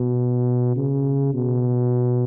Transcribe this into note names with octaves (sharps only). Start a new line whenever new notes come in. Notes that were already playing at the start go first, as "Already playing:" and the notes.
Already playing: B2
C#3
B2